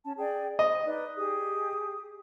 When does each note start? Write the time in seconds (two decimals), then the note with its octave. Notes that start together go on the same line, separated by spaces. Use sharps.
0.04 C#4 A5
0.18 G#4 D5 G5
0.59 C5 D#5
0.85 D#4 B4 D5
1.17 G4 G#4 D#6